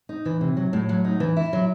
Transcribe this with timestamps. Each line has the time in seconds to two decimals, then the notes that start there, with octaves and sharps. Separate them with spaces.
0.09 D#4
0.26 E3
0.41 C3
0.57 F#3
0.73 A2
0.89 F#3
1.04 D#4
1.20 E3
1.37 E4
1.53 F#3